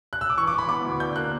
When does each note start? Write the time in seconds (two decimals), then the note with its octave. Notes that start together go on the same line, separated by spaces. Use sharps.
0.13 F#6
0.21 E6
0.30 D6
0.38 E3 C#6
0.47 D6
0.53 E3
0.58 B5
0.68 B3 D6
0.85 D2
1.00 D4 G6
1.16 A#3 F#6